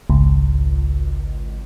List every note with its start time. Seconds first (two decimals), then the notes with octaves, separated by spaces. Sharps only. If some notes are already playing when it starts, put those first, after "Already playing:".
0.10 G#1 C#2